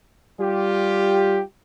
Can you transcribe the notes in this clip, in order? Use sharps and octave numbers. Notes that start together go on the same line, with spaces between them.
G3 F4 G4